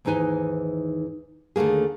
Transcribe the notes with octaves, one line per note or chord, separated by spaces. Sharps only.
D#2 G#2 E3 D#4 B4 G#5
D#2 D3 A3 A#3 G#4